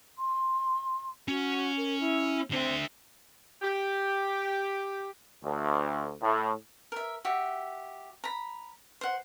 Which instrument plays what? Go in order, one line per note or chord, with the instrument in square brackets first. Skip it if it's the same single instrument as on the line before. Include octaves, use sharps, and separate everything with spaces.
[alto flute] C6
[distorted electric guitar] C#4 [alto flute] F#4
[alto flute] A#4
E4
[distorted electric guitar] D3 E5 [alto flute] C4
[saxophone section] G4
[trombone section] D2
A2
[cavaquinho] A#4 E5
F#4 G4 E5
A#5 B5
C5 F#5